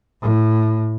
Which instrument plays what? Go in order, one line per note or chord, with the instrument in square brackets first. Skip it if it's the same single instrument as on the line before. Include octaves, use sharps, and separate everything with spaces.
[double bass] A2